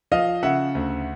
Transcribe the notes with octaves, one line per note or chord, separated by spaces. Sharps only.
F3 D#5 F5
C#3 E5 F#5
D2